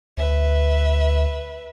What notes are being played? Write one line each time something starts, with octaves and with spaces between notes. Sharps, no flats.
D2 B4 E5